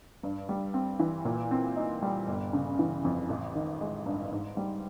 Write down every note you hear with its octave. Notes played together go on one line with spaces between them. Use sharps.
G2
G3
C4
E3
A#2
C4
D#4
G3
G1
C#3
E3
F2
A1
D#3
G#3
G2
G#2
G3